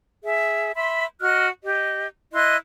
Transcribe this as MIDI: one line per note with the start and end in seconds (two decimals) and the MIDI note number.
0.24 0.71 68
0.24 0.71 76
0.75 1.05 76
0.75 1.05 83
0.75 1.05 84
1.22 1.47 66
1.22 1.47 75
1.22 1.47 89
1.22 1.47 90
1.64 2.06 67
1.64 2.06 75
2.33 2.56 64
2.33 2.56 75
2.33 2.56 84
2.33 2.56 90